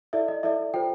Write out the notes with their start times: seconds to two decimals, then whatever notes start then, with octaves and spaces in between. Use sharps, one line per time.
0.13 E4 A4 D5 E5
0.28 D#5
0.43 E4 A4 D5 E5
0.74 F4 A4 C5 G5